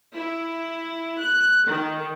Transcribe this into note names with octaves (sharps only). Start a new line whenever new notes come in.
E4
F#6
D#3